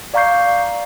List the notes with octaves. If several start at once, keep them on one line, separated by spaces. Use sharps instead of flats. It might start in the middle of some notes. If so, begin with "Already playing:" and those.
D5 F5 A#5 C#6 G6 C7